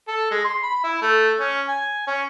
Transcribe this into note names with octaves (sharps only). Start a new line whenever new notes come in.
A4
G#3
C6
B5
E4
A3
C#4
G#5
C#4